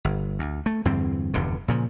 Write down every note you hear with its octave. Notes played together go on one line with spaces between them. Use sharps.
G1
D2
A3
E2 G2 D3 C4
F1 E2 G2 D3
A#2 C#3 F3